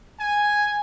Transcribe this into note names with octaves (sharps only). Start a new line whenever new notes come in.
G#5